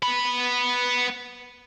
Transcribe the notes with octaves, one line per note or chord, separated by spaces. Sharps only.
B3 B5